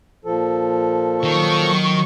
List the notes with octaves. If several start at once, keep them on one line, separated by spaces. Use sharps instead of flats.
A#2 F3 A4
D#3 F#3 C#6